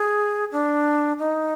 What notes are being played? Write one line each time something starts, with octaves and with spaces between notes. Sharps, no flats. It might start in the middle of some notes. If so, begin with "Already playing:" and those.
Already playing: G#4
D4
D#4